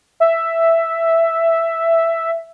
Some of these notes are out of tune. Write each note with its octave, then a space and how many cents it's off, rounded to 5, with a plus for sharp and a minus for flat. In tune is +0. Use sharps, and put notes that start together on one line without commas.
E5 +5